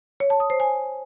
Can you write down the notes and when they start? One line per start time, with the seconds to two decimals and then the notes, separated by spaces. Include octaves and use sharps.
0.20 C#5
0.30 A5
0.40 D#6
0.50 C5
0.60 G#5